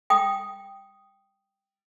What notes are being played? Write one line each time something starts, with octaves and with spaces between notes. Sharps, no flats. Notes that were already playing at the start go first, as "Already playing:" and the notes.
G5 D#6